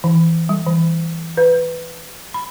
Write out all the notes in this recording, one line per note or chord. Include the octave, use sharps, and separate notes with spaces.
E3
G3
E3
B4
B5